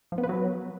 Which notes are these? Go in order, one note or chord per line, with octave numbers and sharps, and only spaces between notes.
F3
B3
B4
F#3